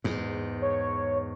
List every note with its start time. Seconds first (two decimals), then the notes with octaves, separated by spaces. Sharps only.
0.04 E2 G#2
0.62 C#5